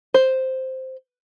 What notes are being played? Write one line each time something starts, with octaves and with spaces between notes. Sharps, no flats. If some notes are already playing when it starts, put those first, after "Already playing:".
C5